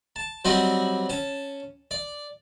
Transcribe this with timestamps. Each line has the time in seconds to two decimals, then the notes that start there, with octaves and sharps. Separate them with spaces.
0.16 A5
0.45 F#3 G3 C4 F#4 D5 D#5
1.09 C#4 A5
1.91 D5